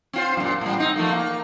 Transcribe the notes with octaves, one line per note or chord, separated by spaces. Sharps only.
C4 F4 C5
F#2 A#2
A2 G3
C4 D#4
F3 A3 A#3
A#3